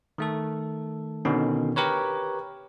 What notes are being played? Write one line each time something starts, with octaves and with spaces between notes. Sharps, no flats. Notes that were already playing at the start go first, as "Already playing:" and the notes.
D#3 A3 A4
B2 D3 D#3 C#4
G4 A#4 B4 C#5